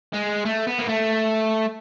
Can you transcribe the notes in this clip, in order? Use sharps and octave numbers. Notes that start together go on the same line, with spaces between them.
G#3
A3
B3
A#3
A3